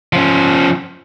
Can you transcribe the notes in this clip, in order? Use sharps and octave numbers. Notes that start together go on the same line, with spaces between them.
F3 C#4